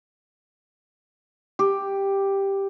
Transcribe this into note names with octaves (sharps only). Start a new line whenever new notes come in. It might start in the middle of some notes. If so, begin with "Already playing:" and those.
G4